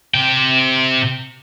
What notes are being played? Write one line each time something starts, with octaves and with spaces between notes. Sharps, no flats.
C3 G5